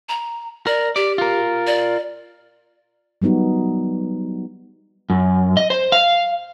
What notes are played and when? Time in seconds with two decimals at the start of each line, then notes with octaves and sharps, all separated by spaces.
0.09 A#5
0.67 A#4 D5
0.96 G4 D5
1.18 F4 A#4
1.67 D5
3.22 F#3 G3 B3 D#4 F#4
5.10 F#2
5.57 D#5
5.70 C5
5.92 F5